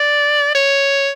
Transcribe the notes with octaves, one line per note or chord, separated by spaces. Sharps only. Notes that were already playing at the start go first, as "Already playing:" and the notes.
Already playing: D5
C#5